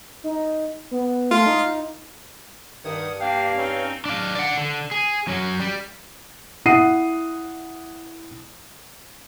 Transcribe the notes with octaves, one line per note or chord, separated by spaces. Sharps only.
D#4
B3
A3 F4
D#4
G2 D#3 F#5 D#6 G#6
A#3 D4 F5 G5
C4 C#4 D#4
D4 F5
D5 F#5
D3
G#4
F#3 C#4
G3
E4 F#5 D#6 C7 D#7